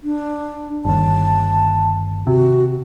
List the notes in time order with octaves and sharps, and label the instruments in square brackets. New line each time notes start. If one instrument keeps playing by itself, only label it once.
[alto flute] D4
[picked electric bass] G1 D#2 [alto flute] A5
[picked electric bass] C3 [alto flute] F#4